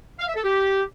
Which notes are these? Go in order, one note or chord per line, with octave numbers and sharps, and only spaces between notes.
F5
E5
A4
G4